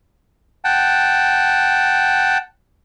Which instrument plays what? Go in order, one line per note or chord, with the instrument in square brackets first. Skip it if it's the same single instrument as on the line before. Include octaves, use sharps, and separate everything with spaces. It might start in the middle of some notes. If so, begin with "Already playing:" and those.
[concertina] F#5 G5 A5